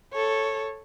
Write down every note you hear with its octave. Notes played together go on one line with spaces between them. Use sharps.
A4 C#5